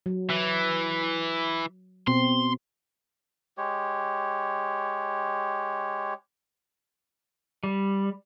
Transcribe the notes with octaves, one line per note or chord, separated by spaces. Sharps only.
F#3
E3
B2 C4 C6
G#3 G4 C#5
G3